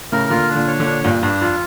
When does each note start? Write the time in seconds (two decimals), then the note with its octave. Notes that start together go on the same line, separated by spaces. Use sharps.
0.12 A2 C#3 A#4
0.30 A#2 D3 F4
0.49 D4
0.55 A#2 D3
0.68 C#5
0.80 A#2 D3
0.86 D4
1.04 G2 A#2 D4
1.23 G2 D4
1.41 F2 F4